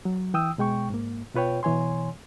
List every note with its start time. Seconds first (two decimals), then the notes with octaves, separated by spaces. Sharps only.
0.05 F#3
0.34 E3 G5 D#6 E6
0.58 B2 G#3 G5 C#6
0.90 G#2 A#3
1.35 B2 F4 B4 C#5 G5
1.63 B2 E3 C#5 G#5 C6